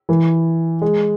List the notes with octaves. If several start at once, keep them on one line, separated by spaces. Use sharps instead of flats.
E3
G#3